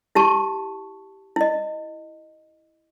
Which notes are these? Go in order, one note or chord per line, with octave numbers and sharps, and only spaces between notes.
E4 G4 A5 C#6
E4 D#5